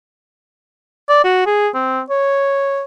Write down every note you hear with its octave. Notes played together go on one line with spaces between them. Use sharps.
D5
F#4
G#4
C4
C#5